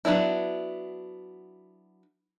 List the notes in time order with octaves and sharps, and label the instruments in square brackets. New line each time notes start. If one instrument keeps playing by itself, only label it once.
[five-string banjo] F#3 B3 D4 E4